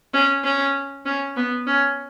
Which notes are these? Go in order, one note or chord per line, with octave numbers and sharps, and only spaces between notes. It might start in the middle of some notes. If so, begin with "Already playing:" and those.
C#4
C#4
C#4
B3
C#4